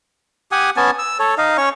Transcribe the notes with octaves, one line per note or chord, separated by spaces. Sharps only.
G4 F#5 G#5 D#6
B3 C#4 G#5 A5
E6
A4 C#5
D#4 D#5 F5
C#4 C#5 C#6